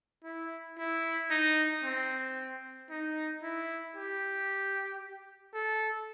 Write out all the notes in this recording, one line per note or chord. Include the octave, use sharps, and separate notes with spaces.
E4
E4
D#4
C4
D#4
E4
G4
A4